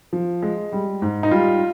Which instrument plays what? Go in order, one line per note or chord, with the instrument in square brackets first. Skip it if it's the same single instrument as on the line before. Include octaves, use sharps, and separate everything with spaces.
[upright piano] F3
G#3
G3
G#2
D#4
G3 F4